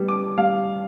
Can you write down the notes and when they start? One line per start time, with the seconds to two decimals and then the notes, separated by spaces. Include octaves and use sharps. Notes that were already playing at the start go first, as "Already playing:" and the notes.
Already playing: G3 B3
0.08 D6
0.38 G3 F5